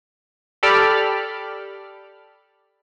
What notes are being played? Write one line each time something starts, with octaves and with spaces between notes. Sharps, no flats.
G4 A4 D5 B5 F6